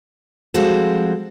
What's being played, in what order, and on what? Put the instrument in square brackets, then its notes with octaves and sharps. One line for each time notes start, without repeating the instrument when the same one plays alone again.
[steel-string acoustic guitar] F3 G3 G#3 C4 F#4 A4